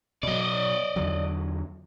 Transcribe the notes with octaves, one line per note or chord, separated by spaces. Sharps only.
B2 F#3 D5 D#5
E2 D3 F#3